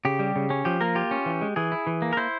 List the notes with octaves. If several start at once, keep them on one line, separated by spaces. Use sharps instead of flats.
C#3 G4
G3
C#3
C#4
F3 G4
A#3 A#4
F4 G4
C#4
E3
G#3
E3 G#4
E4
E3
A#3
A#4
E4 C5